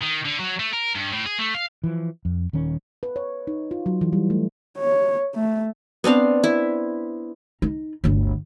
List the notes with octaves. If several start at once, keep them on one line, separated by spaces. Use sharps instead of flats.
D#3
D3
F#3
A3
A#4
G2
A2
G#4
A3
F5
E3 F3
F2
D#1 D#3 C#4
B4
C#5
D#4
F4
F#3
E3
G3
A3
C#5
A3
B3 C4 D4 F5
E4
D#4
G1 D2